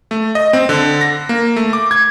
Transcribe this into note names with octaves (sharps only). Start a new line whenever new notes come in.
A3
D#5
C4
D3
A#6
A#3
A3
D6
G#6